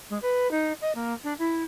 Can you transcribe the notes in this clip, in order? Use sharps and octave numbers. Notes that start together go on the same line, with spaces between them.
G#3
B4
D#4
D#5
A#3
D4
E4